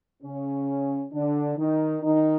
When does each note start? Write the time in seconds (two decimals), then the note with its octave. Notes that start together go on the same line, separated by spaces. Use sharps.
0.23 C#3 C#4
1.13 D3 D4
1.58 D#3 D#4
2.03 D#3 D#4